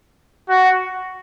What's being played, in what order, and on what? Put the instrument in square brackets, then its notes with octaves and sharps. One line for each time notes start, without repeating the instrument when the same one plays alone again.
[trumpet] F#4